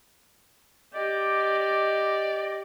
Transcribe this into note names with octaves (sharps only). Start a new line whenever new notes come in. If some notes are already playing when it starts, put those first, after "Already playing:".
G4 D5 D#5
D5